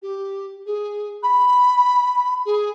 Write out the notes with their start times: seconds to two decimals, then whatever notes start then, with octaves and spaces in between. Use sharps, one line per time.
0.02 G4
0.66 G#4
1.23 B5
2.45 G#4